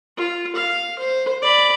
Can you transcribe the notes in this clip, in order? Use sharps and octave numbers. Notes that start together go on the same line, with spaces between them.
F4
F5
C5
D5 B5